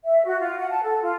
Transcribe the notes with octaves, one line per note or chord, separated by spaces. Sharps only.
E5
F#4
F4
F#5
A5
A4
F4